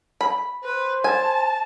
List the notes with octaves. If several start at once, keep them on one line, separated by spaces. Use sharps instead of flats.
B5
B4 C5
G#5 A5